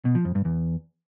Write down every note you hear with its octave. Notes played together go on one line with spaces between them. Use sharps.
B2
F3
F2
G2
E2